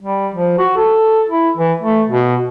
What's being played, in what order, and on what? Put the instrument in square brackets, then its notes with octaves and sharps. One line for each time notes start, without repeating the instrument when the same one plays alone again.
[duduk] G3
F3
F#4
A4
E4
E3
A3
B2